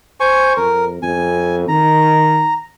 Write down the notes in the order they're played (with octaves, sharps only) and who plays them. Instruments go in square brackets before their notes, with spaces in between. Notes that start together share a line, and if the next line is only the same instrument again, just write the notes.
[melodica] C5 G#5 C#6
[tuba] F2 [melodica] A#4
[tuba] F2 [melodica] G#5
[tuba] D#3 [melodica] A#5